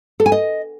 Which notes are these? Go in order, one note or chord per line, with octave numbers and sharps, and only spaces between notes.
A4
G#5
D#5